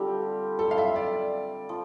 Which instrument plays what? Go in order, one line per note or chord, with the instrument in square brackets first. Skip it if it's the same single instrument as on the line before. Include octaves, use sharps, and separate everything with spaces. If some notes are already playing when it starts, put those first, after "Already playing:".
Already playing: [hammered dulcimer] D3 G3 C4 F4 [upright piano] G4
[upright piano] A4
F5
E5
D5
[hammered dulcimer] F3